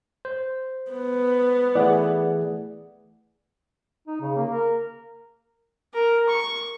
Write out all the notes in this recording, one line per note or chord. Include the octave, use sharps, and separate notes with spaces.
C5
B3
E3 A3 G#4 D5 F#5
D#4
C#3
A#3
A#4
A#4
C#6